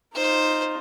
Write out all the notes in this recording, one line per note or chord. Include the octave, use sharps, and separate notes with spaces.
D#4 F4 C5